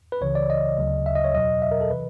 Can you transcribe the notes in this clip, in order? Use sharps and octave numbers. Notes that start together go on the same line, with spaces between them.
B4
C#2 C#3 E3 C#5
D5
D#5
D2 C#3 F#3
E5
D#5
C#5
E2 B2 F#3 D#5
E5
A#4
A4
C3 E3 B4